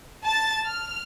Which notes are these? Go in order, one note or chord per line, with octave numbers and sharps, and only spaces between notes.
A5 A6
F6